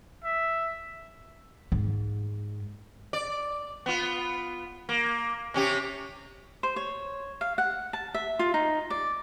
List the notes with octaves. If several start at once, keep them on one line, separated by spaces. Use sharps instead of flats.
E5
G#2
D5
B3 F4
A#3
C3 C#4 G4
C5
C#5
F5
F#5
A5
E5
F4
D#4
D5